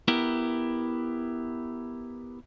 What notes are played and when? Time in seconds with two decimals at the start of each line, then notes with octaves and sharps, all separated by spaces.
0.08 B3 E4 G4 A#4